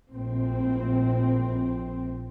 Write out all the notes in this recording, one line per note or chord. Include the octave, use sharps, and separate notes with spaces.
A#1 A2 C4